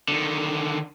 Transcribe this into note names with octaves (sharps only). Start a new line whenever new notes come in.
D3 D#3